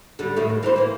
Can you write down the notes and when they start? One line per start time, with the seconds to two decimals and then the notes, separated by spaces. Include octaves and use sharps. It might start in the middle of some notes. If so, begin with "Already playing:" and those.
0.19 D3 G3
0.37 A2 D#3 A3
0.49 A#3
0.63 E3 A#4 C5
0.76 E3 A#3